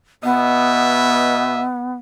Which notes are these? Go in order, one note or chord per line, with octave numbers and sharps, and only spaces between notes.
B2 B3 D#5 E5